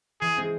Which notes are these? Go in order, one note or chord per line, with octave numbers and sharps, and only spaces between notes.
E3 G#4
G#3 C4